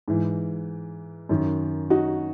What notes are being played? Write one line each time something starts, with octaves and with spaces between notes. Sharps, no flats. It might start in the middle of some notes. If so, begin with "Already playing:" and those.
G#2 E3
F#2 D#3
D#4 F#4